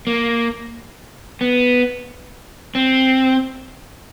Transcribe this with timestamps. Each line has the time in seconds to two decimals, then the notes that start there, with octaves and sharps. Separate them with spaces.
0.07 A#3
1.41 B3
2.75 C4